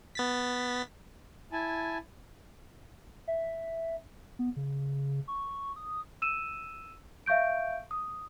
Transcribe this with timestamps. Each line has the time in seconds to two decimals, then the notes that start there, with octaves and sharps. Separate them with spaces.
0.15 B3 A6 B6
1.52 E4 G#5 A5
3.28 E5
4.39 B3
4.56 C#3
5.28 C#6
5.76 D#6
6.22 E6 D#7 E7
7.26 E5 F5 C#6 G6 D7
7.91 D#6